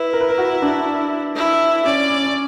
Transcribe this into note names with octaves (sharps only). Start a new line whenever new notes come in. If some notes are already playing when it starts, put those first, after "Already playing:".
Already playing: E4 B4
A#4
B4
A#4
F#4
D4
E4
C#4 D5
C#4
C#4